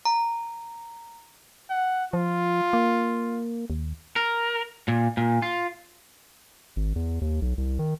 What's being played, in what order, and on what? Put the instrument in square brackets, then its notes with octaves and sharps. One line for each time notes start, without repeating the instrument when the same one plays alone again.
[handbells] A#5
[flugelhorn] F#5
[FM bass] F3 [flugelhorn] F4
[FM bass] A#3
D#2
[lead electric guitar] A#4
A#2
A#2
F4
[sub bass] G#1
E2
D#2
B1
C2
D#3